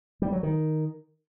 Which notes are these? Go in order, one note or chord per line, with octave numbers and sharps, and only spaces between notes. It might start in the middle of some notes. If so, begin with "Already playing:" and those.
G3
F#3
D#3